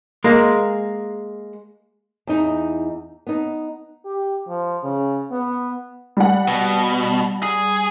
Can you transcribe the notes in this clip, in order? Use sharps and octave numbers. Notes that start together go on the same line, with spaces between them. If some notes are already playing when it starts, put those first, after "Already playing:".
G#3 A#3
E2 D#4
B3 D#4
G4
F3
C#3
B3
G3 F#5
B2
G#4